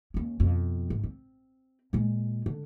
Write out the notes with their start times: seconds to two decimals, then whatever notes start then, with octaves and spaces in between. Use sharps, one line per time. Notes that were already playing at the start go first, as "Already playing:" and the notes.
0.14 D#2 C#4
0.40 F2 B2
0.90 G#1
1.04 C4
1.93 A#2 G#3
2.46 D3